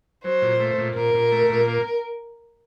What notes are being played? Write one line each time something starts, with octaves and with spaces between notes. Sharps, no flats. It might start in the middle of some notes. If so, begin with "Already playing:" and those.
F#3 C5
A#2
A3
A#2
A#2 A#4
A#2
A3
A#2
A#3